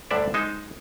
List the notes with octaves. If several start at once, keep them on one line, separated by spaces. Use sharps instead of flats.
D2 G2 D3 D4 D5 E5
G#3 D#4 C5